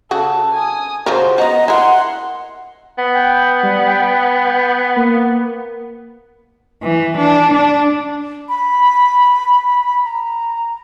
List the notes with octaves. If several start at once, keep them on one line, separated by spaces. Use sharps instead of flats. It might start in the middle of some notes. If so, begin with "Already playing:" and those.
C#3 F#4 A4
G#5 D#6
C#3 F3 F#4 A#4 C5
B3 F#4 D#5 A#5
E4 A#4 F#5 C6
B3
G5
G3
G5
A#3
E3
D4
D4
B5
A#5